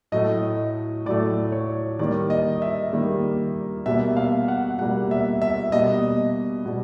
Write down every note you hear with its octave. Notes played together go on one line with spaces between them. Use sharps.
A2 F#3 A3 D#5
A2 F#3 A3 D5
C#5
D#3 G3 A#3 D5
D#5
E5
D#3 G3 A#3
B2 G3 A#3 E5
F5
F#5
B2 G3 A#3 F#5
E5
E5
B2 G3 A#3 D#5
B2 G3